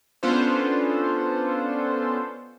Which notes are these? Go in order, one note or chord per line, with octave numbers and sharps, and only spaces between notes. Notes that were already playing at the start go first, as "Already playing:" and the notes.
B3 C#4 D4 F4 A4 C5